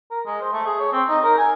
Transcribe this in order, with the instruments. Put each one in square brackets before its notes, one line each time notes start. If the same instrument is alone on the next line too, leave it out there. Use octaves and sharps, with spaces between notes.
[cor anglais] A#4
G#3
C5
A3
G#4
C#5
C4
D#4
A#4
G#5